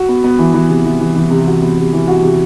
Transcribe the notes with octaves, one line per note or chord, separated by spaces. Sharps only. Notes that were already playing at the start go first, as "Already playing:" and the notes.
Already playing: F#4
B3
B3
E3
E3
C3
E3
E3
E3
C3
F#4
B3
C3
E3
F#4
C3